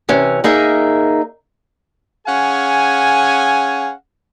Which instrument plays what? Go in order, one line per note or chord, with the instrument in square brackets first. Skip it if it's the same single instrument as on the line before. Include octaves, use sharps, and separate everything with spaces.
[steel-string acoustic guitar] C3 E3 C#4
A#3 D#4 G#4 A#4 E5
[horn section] C#4 G#4 F5 F#5 G#5